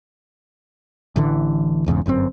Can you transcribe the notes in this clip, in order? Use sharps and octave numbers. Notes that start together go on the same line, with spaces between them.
A1 D3 E3
E1 E2 G#2 C#3
G1 F#2 D3 C4